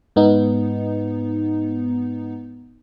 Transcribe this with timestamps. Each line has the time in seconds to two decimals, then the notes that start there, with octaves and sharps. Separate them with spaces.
0.16 G#2 B3 D#4